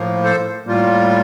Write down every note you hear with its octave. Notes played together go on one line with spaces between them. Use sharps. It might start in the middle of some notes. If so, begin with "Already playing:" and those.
Already playing: A2 F3 A#3
A4 C5
A2 G3 A#3 F4